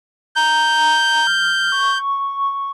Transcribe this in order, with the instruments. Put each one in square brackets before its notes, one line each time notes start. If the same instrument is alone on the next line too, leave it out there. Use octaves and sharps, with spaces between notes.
[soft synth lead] A#5 [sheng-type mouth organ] G6
[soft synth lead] F6
C#6